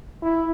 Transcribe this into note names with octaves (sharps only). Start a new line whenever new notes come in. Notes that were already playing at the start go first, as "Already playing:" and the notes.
E4